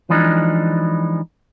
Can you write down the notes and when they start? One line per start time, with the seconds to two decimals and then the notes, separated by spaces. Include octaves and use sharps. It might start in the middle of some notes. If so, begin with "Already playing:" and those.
0.10 E3 F3 G#3 D4 D#4